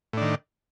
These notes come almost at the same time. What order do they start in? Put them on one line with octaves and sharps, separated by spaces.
A2 D4 D#3